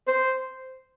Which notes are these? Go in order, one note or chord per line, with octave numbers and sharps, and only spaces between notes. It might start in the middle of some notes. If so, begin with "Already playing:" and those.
C5